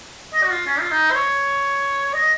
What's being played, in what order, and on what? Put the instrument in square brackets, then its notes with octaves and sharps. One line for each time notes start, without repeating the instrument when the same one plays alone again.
[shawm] D#5
F#4
F4
C#4
F4
D#4
C5
C#5
D#5